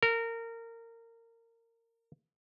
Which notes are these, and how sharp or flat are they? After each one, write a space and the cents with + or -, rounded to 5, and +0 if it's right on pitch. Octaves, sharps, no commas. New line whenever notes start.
A#4 -25